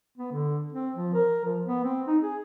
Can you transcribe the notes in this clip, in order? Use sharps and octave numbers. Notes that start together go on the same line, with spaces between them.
B3
D3
C4
F3
A#4
F3
B3
C4
D#4
G#4